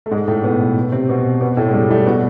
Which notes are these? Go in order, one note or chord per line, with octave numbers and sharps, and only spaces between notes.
A3
G#2 G#3
A2 A3
B2 B3
C3 C4
B2 B3
B2 B3
A2 A3
G#3
G2 G3
A2 A3
B2 B3